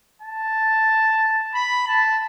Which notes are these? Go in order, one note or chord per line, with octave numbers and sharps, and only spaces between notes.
A5
B5
A5